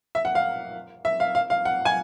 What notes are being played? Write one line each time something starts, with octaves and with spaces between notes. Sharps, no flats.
E5
F#5
F5
E5
F5
F5
F5
F#5
G#5